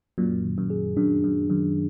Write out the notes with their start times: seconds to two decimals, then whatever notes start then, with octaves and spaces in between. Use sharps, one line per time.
0.18 F#2 A#2 F#3
0.44 D#3
0.58 F#2
0.70 G#4
0.97 F#2 D4
1.24 F#2 F#3
1.50 F#2 D#3